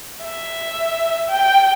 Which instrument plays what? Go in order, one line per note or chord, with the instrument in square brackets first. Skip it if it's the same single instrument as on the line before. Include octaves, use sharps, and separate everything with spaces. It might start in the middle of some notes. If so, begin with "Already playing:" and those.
[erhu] E5
G5